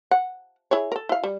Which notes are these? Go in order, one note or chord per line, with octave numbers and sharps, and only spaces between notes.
F#5
E4 G#4 C#5
A4 A#4
E4 F5
G3